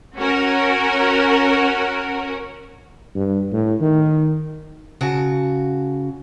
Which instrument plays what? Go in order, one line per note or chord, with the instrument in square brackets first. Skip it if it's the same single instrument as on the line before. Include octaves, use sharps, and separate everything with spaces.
[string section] C#4 F#4 A#4
[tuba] G2
A2
D#3
[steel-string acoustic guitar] C#3 F#4 A5